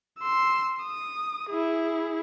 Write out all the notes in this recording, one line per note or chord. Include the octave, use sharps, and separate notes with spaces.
C6 E6
D#6
E4 G#4